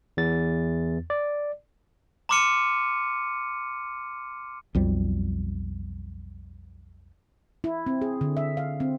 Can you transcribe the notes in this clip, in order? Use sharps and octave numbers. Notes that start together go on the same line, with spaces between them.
E2 A6
D5
A#5 C6 D6 F6 C#7 D#7
B1 F2 G3
E4
C4
G#4
D3
E5
F5
C4